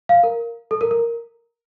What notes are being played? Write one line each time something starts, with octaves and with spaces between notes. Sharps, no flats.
F5
A#4
A4
A#4
A#4